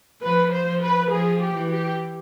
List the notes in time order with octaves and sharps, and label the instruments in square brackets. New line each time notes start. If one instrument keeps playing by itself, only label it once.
[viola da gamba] F3 [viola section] B4
[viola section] C5
[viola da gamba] F3
[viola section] B4
[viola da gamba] F3 [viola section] G#4
[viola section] G4
[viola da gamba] E3
[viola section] G4